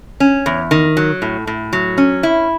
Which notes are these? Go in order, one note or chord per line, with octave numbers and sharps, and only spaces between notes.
C#4
E2
D#3
F#3
A2
A2
F#3
C#4
E4